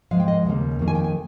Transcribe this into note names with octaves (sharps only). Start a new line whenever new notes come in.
G#2 F3 G#3 F5
G5
D#5
D#2 C#3 G3 A#3
F2 D#3 A#3
G#5
G5
G#5